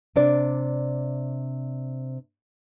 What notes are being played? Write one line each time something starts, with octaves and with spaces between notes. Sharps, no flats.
C3 D4 D5